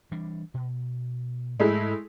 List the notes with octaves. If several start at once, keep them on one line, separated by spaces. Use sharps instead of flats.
E3 G3 D4
B2
G#2 G#3 A3 E4